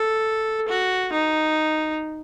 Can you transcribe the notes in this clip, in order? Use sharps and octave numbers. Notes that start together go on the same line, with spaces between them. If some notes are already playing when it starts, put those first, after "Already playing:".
Already playing: A4
F#4
D#4